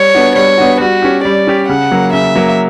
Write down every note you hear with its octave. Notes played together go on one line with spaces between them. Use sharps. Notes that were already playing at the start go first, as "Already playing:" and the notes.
Already playing: G3 C#5
B3 D4 F#4
G3 C#5
B3 D4 F#4
G3 F#4
C#4 G4
G3 D5
C#4 G4
C#3 F#5
F#3 A#3
C#3 E5
F#3 A#3